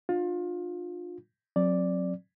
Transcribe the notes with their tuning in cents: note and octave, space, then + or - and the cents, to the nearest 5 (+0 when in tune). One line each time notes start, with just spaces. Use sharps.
D4 +40 F4 +25
F#3 -20 C4 +30 D5 +0